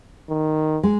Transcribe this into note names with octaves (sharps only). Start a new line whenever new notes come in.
D#3
G#3